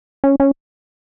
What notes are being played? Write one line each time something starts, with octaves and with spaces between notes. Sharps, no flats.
C#4
C#4